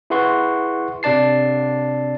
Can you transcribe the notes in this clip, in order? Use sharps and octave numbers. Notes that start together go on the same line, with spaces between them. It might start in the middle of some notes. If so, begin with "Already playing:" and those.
E4 G#4 B4 F#5 C6 C#6
C3 D4 D5 A5 C7